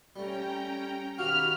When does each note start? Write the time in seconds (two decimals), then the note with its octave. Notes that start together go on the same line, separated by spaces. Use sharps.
0.16 G3 A3 C#4 G5 A#5
1.18 D#3 F#4 G4 F5 B5 F6